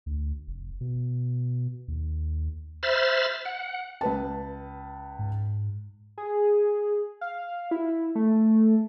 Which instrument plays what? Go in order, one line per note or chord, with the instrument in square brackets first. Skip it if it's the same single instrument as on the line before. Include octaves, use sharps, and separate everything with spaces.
[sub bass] D2
F1
B2
D#2
[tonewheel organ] C5 E5 B5 F6 A6
F#5
[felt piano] C#2 B4 A5
[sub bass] G#2
[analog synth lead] G#4
F5
E4
A3